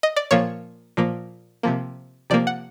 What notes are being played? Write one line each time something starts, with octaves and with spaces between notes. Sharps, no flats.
D#5
D5
A#2 F3 A#3 C#5
A#2 F3 A#3
C3 F3 A#3
C3 F3 A#3 D5
F#5